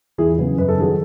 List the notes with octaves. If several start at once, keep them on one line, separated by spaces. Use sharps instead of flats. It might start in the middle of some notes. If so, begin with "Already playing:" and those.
E2 E4 G#4
C#3 F#3 B3
F#2 B4
A4
D#3 F#3 G#4